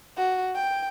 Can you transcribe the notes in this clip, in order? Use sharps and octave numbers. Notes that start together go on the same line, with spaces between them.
F#4
G5